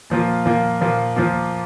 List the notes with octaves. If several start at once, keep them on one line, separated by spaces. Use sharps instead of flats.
A#2 F3 A#3 F4
A#2 F3 A#3 F4
A#2 F3 A#3 F4
A#2 F3 A#3 F4